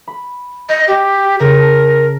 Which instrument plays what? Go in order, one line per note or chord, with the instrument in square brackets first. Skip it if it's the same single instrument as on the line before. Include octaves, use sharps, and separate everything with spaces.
[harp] B5
[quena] D#5 [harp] G6
[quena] G4
[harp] C#3 [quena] A#4
[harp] A5